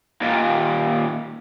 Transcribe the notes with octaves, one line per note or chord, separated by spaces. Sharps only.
D#2 A#2